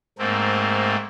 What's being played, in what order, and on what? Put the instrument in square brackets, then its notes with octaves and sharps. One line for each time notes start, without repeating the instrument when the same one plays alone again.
[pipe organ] G#2 A3 A#3 C4